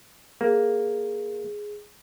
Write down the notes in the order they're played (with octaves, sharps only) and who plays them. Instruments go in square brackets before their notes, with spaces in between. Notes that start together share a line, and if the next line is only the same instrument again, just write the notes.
[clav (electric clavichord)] A#3 [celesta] G#4